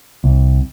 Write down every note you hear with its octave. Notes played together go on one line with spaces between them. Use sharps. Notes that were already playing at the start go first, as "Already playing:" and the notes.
C2